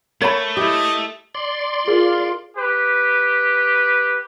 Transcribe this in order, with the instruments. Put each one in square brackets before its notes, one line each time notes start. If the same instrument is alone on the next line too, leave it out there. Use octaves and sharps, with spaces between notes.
[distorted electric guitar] A3 [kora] A#4 [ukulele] C#5 B5
[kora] E4 G4 [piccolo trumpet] D#5
[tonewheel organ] D5 C6
[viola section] F4 [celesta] G#4 A#4
[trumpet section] G4 B4